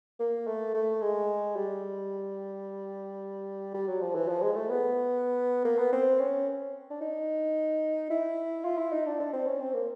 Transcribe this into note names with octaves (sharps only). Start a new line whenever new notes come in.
A#3
A3
A3
G#3
G3
G3
F#3
F3
E3
F3
G#3
A3
B3
A#3
B3
C4
C#4
D4
D#4
E4
F4
E4
D#4
D4
D4
C4
C#4
C4
A#3